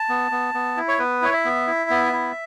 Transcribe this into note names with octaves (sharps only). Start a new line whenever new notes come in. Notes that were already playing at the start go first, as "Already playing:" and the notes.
Already playing: A5
B3
B3
B3
E4
C#5
B3 B4
E4 C#5
E5
B3
E4
B3
E4